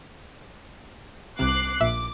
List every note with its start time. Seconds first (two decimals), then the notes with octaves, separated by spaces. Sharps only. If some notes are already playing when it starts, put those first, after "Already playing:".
1.39 C2 C3 D6 F#6 C7
1.80 A#1 A#2 E5 D6